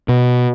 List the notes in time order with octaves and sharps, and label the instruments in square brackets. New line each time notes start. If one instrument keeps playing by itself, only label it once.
[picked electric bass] B2